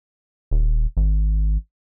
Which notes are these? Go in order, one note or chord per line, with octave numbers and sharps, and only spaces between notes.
D#1
G#1